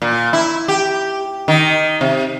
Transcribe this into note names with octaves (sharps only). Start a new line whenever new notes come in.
A#2
E4
G4
D#3
C3